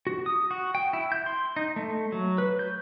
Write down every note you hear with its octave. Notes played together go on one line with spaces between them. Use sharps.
F#4
D#6
F#4
G5
E4
G6
C6
D#4
A3
F#3
B4
G6